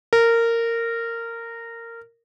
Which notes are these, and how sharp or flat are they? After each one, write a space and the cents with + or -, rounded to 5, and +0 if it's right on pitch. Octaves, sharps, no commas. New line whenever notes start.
A#4 -15